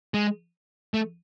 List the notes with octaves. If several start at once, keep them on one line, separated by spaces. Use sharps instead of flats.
G#3
A3